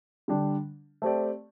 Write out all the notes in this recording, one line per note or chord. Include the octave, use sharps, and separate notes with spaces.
D3 G3 D4
A3 C4 G4 D5